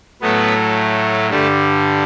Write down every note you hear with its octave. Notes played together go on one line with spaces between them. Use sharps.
A2 F#3 A3 B3 B4
G2 D3 G3 A3 A4